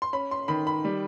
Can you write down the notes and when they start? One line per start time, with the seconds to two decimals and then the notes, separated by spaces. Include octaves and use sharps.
0.02 C6
0.13 C#4 B5
0.31 C6
0.48 D#3 B5
0.67 B5
0.85 G3